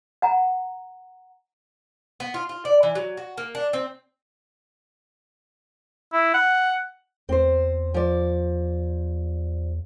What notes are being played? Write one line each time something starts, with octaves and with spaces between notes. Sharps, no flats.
F#5 G#5 A#5
B3
F4
F4
D5
E3
F#3
F#4
A#3
D4
C4
E4
F#5
E2 C4 C5
F3 D5